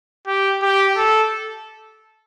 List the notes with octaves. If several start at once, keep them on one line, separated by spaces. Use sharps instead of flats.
G4
G4
A4